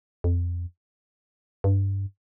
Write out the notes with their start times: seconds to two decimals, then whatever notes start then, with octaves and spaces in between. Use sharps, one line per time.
0.24 F2
1.64 G2